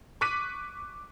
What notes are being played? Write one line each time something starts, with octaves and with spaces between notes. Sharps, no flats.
C#6 D6 F#6 B6 D#7